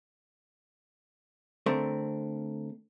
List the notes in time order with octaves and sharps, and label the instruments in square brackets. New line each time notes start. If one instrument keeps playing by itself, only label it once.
[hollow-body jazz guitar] D3 A3 C4 A#4